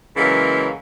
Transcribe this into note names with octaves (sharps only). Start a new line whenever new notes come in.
C#3 E3 F#3 G#3 A#3